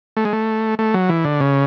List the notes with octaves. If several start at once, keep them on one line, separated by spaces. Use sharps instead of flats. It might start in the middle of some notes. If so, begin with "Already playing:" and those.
A3
G#3
A3
A3
F#3
E3
D3
C#3